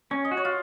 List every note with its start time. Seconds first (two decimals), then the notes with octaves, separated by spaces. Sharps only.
0.11 C#4 C#5
0.25 D#5
0.31 F#4
0.37 C#5
0.45 F4